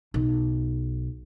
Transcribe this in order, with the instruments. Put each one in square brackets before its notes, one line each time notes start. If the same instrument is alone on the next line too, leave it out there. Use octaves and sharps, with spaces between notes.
[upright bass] B1